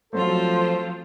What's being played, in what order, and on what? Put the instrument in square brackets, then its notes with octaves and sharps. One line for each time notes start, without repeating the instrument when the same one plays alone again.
[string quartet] F3 C4 F4 [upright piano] F#3 A3 [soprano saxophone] A4 [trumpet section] C5